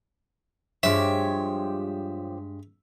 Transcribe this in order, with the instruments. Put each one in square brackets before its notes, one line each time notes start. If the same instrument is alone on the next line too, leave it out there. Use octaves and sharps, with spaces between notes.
[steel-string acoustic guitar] G2 G#3 [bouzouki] F3 G4 C#5 [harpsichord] E5